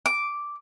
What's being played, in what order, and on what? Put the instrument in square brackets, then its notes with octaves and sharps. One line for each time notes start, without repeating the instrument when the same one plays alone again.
[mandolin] D6